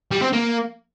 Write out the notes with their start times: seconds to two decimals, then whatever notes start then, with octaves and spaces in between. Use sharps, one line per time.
0.11 G3
0.22 C4
0.33 A#3